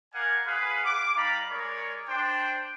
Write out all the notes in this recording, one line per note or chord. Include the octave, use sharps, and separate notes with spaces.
A#4 D5 F5 F#5 G#5
F4 G#4 B4 F5 F#5 B5
D6
G3 D#4 D5 F5 A#5 B5
G#3 A#4 C#5 D5
D4 C5 G5